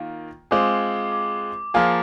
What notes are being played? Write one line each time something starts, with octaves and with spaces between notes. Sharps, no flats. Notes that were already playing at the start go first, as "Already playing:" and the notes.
Already playing: D#3 A#3 F4
G#3 C4 F4 G#4 D6
D6
F3 A#3 F4 G#4